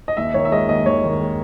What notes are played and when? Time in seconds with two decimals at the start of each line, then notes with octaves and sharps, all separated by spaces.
0.08 D#5
0.17 D#2 E5
0.34 D#3 C#5
0.45 E5
0.52 G#3 D#5
0.69 D#2 D#5
0.86 D#2 C#5
1.04 D#3
1.20 G#3